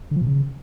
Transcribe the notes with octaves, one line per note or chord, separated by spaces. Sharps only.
D3
F3
B2
C#3